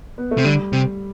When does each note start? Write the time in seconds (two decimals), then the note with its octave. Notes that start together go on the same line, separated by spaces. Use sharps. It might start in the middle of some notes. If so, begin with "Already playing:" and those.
0.18 B3
0.31 A3
0.38 C3
0.44 D3 G3
0.73 C3